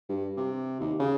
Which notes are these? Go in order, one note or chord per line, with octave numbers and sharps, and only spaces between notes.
G2
C3
D#2
C#3